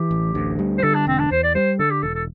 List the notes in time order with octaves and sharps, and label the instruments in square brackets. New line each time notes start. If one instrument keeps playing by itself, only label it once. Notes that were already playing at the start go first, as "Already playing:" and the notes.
Already playing: [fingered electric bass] E3 [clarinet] G4
[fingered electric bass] A1
D2
G3
[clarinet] C5
[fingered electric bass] D3 [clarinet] A4
[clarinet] D4
[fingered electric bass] E1 [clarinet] C4
[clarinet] D4
[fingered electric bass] E2 [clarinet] C5
[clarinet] D5
[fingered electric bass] G3 [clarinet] C5
[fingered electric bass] D3 [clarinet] A4
[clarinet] G4
[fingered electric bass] E1 [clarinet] A4
[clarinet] A4